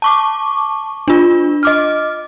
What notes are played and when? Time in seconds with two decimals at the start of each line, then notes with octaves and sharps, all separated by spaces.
0.02 A5 C#6 D6
1.08 D4 F4
1.63 D#5 D6 F6